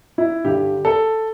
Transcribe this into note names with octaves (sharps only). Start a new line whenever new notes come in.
E4
G2 D3 G4
A4